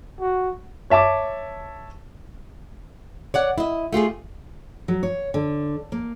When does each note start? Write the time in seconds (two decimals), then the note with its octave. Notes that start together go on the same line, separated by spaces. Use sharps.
0.20 F#4
0.90 C#5 E5 A5 D6
3.34 C#5 D5 F#5
3.58 E4 D#5
3.93 A3 F4 G4 G#4
4.88 F#3
5.03 C#5
5.34 D3
5.92 A#3